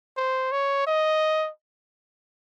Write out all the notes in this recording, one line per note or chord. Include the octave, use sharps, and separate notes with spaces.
C5
C#5
D#5